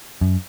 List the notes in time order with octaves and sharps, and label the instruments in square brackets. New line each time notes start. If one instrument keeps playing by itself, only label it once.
[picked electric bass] F#2